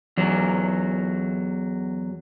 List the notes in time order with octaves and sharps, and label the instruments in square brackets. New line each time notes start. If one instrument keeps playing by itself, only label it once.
[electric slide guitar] E2 F#3